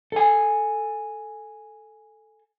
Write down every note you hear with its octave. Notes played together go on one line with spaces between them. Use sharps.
A4 G#5